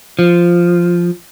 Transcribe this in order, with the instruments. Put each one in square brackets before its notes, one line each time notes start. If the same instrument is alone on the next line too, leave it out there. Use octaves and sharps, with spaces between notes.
[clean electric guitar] F3